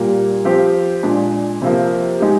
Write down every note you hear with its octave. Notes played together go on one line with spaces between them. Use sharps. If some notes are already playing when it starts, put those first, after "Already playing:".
Already playing: A#2 G3 A#3
F3 C4 G4 C5
A#2 G#3 D4
C3 F3 A#3
G#3 D#4 G4